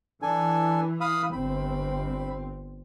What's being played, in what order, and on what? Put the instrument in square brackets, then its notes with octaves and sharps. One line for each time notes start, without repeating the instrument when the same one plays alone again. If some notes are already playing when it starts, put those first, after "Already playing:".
[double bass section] E3 [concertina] D4 A4 G#5
[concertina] F5 B5 D#6
[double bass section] G1 C4 [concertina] B5